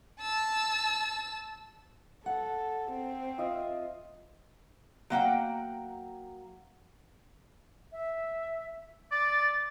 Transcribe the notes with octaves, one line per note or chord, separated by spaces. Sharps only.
A5 E6
A4 F#5
C4
F4 D#5 E5
F#3 A#3 F#5 G5
E5
D5 A6